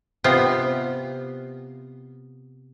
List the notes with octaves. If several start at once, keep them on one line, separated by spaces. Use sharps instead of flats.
C3 B3 F4